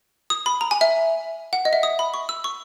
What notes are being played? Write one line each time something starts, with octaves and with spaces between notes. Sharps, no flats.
D#6
B5
A#5
G#5
E5
F#5
D#5
E5
D#6
B5
C#6
E6
C#6